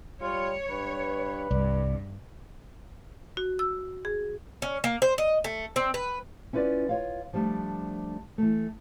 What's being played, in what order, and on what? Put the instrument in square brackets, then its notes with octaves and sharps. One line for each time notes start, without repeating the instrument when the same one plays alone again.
[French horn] G3 [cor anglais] F4 [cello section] C#5
[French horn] G2 [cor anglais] B4
[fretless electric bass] C2 [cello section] G2 [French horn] D5
[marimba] F#4
E6
G#4
[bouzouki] C#4
A#3
C5
D#5
A3
C4
B4
[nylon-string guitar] C#4 E4 F4 B4 D5
F4 C#5 F5
F3 G3 A3 D4
E3 A3